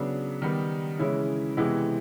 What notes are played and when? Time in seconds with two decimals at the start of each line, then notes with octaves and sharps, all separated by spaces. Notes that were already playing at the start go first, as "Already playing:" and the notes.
Already playing: C#3 F#3 B3 D4
0.42 D#3 G3 B3 D#4
0.99 C#3 E3 G#3 C#4 E4
1.57 C3 E3 G#3 B3